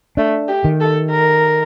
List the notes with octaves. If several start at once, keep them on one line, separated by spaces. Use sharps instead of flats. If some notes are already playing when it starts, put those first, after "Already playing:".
A3 D4
G4
D#3
A4
A#4